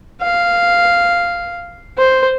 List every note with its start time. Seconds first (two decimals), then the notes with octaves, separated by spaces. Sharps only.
0.22 F5
1.98 C5